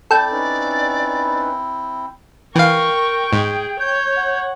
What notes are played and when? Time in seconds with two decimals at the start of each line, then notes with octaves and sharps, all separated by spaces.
0.11 C4 E4 A4 D5 G5
0.32 C#4 D#4 B4
2.56 E3 A#4 F5 G5 C#6
3.33 G#2 G#4
3.80 C#5 G6
4.17 F#5